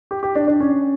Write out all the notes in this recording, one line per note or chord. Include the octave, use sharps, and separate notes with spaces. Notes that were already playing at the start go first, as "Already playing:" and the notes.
G4
G4
D4
D4
C#4